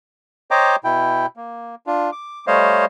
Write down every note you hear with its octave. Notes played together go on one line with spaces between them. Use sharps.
C5 C#5 D#5 G5 A#5 D6
B2 E4 G5
A#3
D4 F4
D6
G3 A3 C5 C#5 D#5 F5